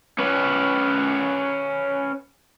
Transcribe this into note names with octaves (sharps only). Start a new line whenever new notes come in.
C#4 B4